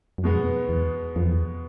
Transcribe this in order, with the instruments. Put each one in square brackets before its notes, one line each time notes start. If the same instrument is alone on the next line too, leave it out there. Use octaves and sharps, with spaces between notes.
[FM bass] F#2
[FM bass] F2 [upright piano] B2 G#3 B3
[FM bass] E2
F2
E2